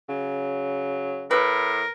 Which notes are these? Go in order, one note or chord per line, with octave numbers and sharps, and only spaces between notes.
C#3 F#3
A2 A#4 B4